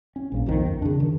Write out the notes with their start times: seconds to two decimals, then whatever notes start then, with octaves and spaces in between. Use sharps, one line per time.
0.16 C#4
0.32 A#1 F3 A#3
0.46 B1 F2 D#3 F3
0.66 F2
0.82 C#3 D4
1.00 D#3